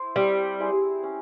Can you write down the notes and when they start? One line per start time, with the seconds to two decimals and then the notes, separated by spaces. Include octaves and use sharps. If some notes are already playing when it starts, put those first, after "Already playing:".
Already playing: E4 C5
0.16 G3 C4
0.60 E4 G#4 C5
1.03 C#4